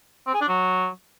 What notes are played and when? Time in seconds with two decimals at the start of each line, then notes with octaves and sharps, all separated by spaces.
0.26 C4
0.34 G#4
0.41 D4
0.48 F#3